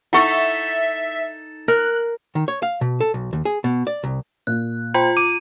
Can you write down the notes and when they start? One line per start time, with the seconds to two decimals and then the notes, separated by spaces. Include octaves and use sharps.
0.13 D#4 E4 A4 E5 F#5 C#6
1.68 A#4 F#6
2.35 D#3
2.48 C#5
2.62 F5
2.81 B2
3.01 A4
3.14 B1
3.33 D#2
3.45 G#4
3.64 B2
3.87 D5
4.04 C2
4.47 A#2 F#6
4.94 F4 C5 G5 B5
5.17 D6 D#7